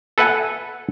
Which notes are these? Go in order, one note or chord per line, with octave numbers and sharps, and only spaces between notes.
A4 B4 E5 F#5 G#5